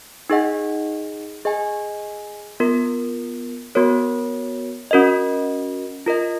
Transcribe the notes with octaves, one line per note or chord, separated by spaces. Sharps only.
D#4 G#4 D#5 F#5
G#4 D#5 G#5
B3 F4 A#4
B3 F#4 A#4 C#5
C#4 F#4 A#4 D#5
F4 A#4 D#5